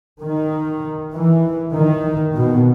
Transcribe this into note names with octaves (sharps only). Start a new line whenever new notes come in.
D#3
E3
D#3
B2